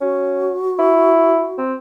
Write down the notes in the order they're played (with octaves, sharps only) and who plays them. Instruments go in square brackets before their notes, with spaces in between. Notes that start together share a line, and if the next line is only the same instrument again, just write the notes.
[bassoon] C#4 [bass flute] F#4
[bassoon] E4
C4